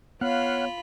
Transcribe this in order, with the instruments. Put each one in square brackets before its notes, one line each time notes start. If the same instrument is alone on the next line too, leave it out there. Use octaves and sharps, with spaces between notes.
[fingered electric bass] B3 [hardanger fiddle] F4 B5 [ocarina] C#5 [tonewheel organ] F5 F#5